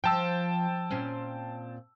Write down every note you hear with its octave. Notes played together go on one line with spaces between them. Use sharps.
F3 G5 A5 E6
A#2 C4 C#4